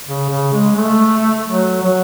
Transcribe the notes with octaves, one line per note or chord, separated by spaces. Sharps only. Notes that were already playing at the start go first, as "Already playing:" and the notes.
C#3
C#3
G#3
A3
F#3
F#3